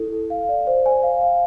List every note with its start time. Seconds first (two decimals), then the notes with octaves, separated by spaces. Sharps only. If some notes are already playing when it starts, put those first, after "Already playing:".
Already playing: E4 A4
0.12 A4
0.30 F5
0.49 D5
0.67 C5
0.86 G#5
1.03 F5
1.21 F5